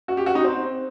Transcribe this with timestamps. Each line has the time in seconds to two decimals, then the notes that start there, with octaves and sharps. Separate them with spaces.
0.08 F#4
0.17 G4
0.26 F#4
0.35 D#4
0.44 C4